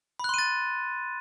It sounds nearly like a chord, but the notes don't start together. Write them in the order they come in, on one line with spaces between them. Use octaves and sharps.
B5 F#6 C6 D#7 A6